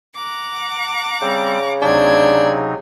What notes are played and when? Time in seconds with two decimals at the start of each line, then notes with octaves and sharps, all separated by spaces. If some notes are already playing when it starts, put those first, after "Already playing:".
0.15 F#5 A#5 D6
1.22 C#3 G3 C4 C5
1.82 D2 C3 F#3 C4 D4 D#4 G#6